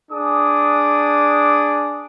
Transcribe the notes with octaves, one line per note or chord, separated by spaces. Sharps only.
D4 G#4 D6 D#6